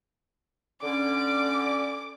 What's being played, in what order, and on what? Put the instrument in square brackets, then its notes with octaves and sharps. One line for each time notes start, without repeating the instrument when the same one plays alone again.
[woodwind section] D3 C#4 [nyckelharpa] D5 [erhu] D6